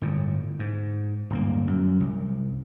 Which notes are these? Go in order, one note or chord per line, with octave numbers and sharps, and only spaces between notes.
G1 A2
G#2
D1 G2 A#3
F#2
C2